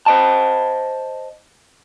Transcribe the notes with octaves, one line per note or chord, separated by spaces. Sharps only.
C5 D#5 A5